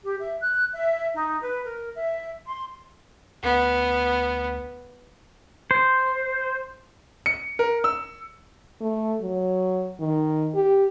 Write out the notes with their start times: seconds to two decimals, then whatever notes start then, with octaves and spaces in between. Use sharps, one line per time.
0.03 G4
0.19 E5
0.41 F#6
0.74 E5
1.14 D#4
1.42 B4
1.64 A#4
1.96 E5
2.47 C6
3.43 D2 B3
5.71 C5
7.26 C#7
7.59 A#4
7.84 E6
8.81 A3
9.21 F#3
10.00 D#3
10.54 G4